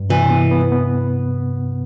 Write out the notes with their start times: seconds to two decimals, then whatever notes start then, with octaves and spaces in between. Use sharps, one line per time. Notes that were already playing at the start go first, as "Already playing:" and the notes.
Already playing: G2
0.10 C3 E3
0.30 B3
0.51 B3
0.72 B3